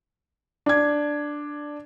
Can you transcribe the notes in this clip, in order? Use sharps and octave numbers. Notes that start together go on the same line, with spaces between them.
D4 G#6